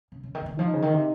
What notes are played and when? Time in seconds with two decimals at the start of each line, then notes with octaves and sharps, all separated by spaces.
0.12 C#3
0.23 C#3
0.35 D#3
0.42 C#3
0.46 D#3
0.58 F3 D#4
0.73 C#3
0.82 D#3
0.94 C3